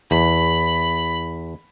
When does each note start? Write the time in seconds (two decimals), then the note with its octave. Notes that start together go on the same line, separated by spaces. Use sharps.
0.11 E2 B5